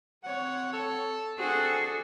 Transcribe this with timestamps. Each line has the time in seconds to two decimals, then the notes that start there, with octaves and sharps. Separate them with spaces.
0.24 C4 C#5 F#5
0.73 A4
1.38 C4 D4 F#4 G#4 A4